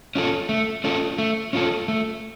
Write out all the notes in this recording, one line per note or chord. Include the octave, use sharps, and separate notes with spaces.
C#4 F4 A4
A3
C#4 F4 A4
A3
C#4 F4 A4
A3